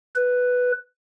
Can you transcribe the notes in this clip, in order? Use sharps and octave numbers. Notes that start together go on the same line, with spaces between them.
B4